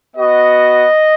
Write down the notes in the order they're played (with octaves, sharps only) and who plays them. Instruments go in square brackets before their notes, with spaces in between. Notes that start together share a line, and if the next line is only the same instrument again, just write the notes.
[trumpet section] B3 F#4 D#5